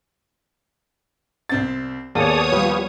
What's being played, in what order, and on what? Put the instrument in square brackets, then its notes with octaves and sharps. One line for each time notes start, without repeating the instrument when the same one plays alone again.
[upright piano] C2 C4 A6
[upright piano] D#2 [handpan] B3 [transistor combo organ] G#4 D5 A5 [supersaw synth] C#5 D#6
[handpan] F3 G3 [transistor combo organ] F4 G4 B4